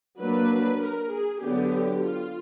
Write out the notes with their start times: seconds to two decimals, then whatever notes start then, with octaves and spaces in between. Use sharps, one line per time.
0.18 F#3 A#3 D4 B4
0.79 A#4
1.10 G#4
1.40 D3 F#3 B3 D4 G4
2.01 F4